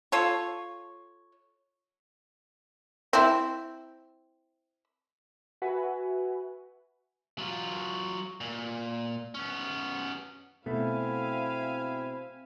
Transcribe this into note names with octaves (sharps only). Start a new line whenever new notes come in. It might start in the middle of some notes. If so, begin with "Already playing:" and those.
F4 A4 C#5
C4 E4
F#4 B4 E5 F#5 G#5
F#3 F4
A#2
B3 C#4
B2 A3 C4 E4 E5 F5 G#5